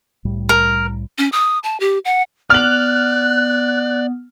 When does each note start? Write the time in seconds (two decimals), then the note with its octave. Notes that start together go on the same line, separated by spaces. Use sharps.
0.25 C2 A2 G3
0.49 A#4
1.18 C#4
1.32 D#6
1.64 A5
1.80 G4
2.05 F#5
2.50 B3 D5 F6 F#6 F#7